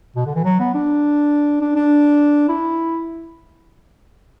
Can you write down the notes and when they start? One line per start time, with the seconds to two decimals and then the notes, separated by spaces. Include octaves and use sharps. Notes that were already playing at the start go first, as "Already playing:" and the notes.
0.16 B2
0.26 D3
0.35 E3
0.45 F#3
0.60 B3
0.74 D4
1.61 D4
1.76 D4
2.49 E4